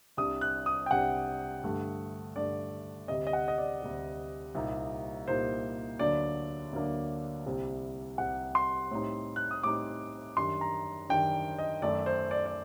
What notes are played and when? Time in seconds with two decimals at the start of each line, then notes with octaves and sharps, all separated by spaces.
0.17 C2 C3 G3 D4 D#6
0.41 F#6
0.66 D#6
0.86 G5
0.91 C2 C3 G3 D4 F#5
1.63 G2 D3 A3
2.36 G2 D3 A3 D5
3.08 D2 C3 G3 D#5
3.27 D#5
3.33 F#5
3.48 D#5
3.58 D5
3.82 D2 C3 G3
4.55 C2 A#2 G3 A#3 D#4
5.28 C2 A#2 G3 A#3 D#4 C5
5.99 D2 D3 F#3 A#3 D4 D5
6.73 D2 D3 F#3 A#3 D4
7.46 C2 C3 G3
8.18 C2 C3 G3 F#5
8.55 C6
8.91 A2 G3 C4 D#4
9.36 F#6
9.51 D#6
9.63 A2 G3 C4 D#4 D6
10.37 F#2 D#3 G3 D4 C6
10.61 A#5
11.09 F#2 D#3 G3 D4 G5
11.59 D#5
11.82 F#2 D#3 A3 D5
12.06 C5
12.31 D5
12.46 D5